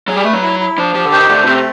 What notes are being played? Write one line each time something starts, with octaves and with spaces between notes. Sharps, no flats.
F#3 G#4
G3
A3 B4
F#3
E4
E4
F3 D4
F3 G4
D3
D#3 C5
D3 A3
B2
C3 C4